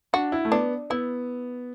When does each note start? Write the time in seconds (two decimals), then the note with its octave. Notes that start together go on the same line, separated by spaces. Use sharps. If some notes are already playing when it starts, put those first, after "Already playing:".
0.13 D4 F#4
0.32 E4
0.45 A3
0.52 B3 D4
0.90 B3 E4